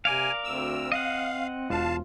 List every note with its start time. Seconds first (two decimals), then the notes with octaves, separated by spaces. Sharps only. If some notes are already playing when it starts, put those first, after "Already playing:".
0.05 C3 A#4 D5 F5 G#5
0.44 D2 C4 E6
0.92 D#5 F5 F#5
1.70 E1 F4 F5 A5